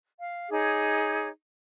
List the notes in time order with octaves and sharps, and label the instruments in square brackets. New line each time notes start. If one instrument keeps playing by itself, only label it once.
[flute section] F5
D#4 G#4 C#5 D6